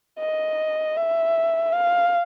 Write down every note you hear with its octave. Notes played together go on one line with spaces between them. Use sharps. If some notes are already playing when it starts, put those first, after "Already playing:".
D#5
E5
F5